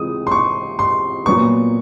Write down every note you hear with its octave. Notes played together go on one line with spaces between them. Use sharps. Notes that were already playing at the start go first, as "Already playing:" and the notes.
Already playing: C#2 C3 E3 G#3 D#6
C6
C#6
C6
A#2 F#3 B3 C#6